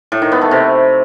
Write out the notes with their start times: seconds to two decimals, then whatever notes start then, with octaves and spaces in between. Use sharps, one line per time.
0.12 A2
0.22 D#3
0.32 B3
0.41 A3
0.51 C3